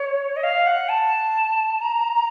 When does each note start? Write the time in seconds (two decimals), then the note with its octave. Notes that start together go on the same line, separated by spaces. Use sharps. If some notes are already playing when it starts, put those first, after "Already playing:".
Already playing: C#5
0.37 D#5
0.43 F5
0.67 F#5
0.89 A5
1.81 A#5